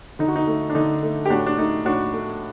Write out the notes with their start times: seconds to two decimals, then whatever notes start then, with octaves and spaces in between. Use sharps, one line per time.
0.19 D3 D#4
0.28 F#4
0.36 D#4
0.47 A3
0.70 D4
0.75 D3 D#4
1.03 A3
1.26 G4
1.30 A2 D4 F#4
1.46 D4
1.58 A3 D#4
1.85 A2 D4 F#4
2.13 A3